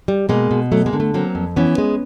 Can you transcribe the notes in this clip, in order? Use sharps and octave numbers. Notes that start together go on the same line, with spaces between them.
G3
B2 G#3 A#3
B2
F#3 A3
G#3 A#3
D3
A3
F#3 A#3 C4
F2
E3 B3 C#4
G#3